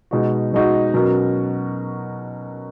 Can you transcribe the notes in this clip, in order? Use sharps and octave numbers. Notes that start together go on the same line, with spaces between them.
B2 G#3 D#4 F#4
B2 G#3 D#4 F#4
B2 F#3 C#4 F#4 A#4